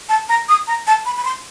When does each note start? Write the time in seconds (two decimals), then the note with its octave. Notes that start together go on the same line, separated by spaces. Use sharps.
0.09 A5
0.29 A#5
0.49 D#6
0.67 A#5
0.87 A5
1.06 B5
1.16 B5
1.24 C6